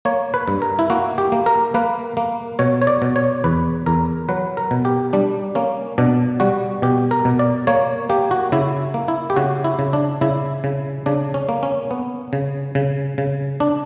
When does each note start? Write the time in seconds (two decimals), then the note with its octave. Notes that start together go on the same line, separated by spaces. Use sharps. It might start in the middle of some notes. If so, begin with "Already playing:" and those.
0.05 A#3 C#5
0.34 B4
0.48 G2
0.62 A#4
0.79 E4
0.90 A#3 F#4
1.18 G4
1.32 A#3
1.46 A#4
1.74 A#3 B4
2.17 A#3
2.59 B2 C#5
2.82 C#5
2.87 D5
3.02 B2
3.16 C#5
3.44 E2 B4
3.86 E2 A#4
4.29 F#3 B4
4.57 A#4
4.71 B2
4.85 G4
5.13 G3 D4
5.55 A#3 C#4
5.98 B2 D4
6.40 G3 F#4
6.82 B2 G4
7.11 A#4
7.25 B2
7.39 D5
7.67 A#3 C#5
8.09 A#3 G4
8.31 F#4
8.52 C#3 E4
8.94 A#3
9.08 E4
9.30 G4
9.36 C#3 F#4
9.64 E4
9.79 C#3
9.93 D4
10.21 C#3 E4
10.64 C#3
11.06 C#3 D4
11.34 C#4
11.49 A#3
11.63 C#4
11.91 B3
12.33 C#3
12.75 C#3
13.18 C#3
13.60 D4